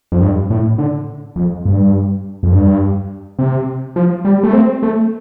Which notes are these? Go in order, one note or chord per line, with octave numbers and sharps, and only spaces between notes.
F2
G2
A2
D3
F2
G2
F2
G2
C3
F3
G3
A3
C4
A3